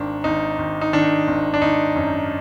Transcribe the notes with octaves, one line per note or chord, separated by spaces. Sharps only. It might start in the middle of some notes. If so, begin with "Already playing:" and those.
Already playing: G#1 D#3 D4
G#1 D#4
G#1
D#4
D#3 D4
G#1
D4
G#1 D#4
F#2